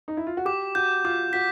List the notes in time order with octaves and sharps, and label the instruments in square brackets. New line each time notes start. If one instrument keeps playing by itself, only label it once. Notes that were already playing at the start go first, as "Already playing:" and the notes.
[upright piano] D#4
E4
F4
F#4
[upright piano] G4 [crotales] D6
[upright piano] F#4 [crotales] G6
[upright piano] F4 [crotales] D6
[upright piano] F#4 [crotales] B6